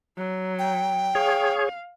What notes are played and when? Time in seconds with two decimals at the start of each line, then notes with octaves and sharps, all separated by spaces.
0.17 F#3
0.59 G5
1.15 G#4 C#5 F5